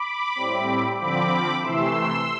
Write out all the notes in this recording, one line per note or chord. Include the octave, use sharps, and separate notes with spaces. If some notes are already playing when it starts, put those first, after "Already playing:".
Already playing: B5 D6
A2 G3 C4
D3 F3 C4 B5 D6
C3 E3 A3 C6 E6